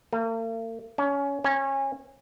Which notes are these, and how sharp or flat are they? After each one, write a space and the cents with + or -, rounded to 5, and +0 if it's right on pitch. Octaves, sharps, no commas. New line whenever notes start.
A#3 -45
C#4 +20
C#4 -25